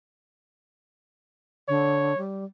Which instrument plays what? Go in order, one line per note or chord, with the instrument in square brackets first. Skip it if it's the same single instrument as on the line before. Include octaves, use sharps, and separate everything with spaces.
[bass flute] D3 [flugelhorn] C#5
[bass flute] G3